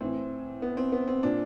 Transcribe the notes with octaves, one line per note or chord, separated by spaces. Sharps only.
A2 E3 C4
B3
C4
B3
C4
A#2 D4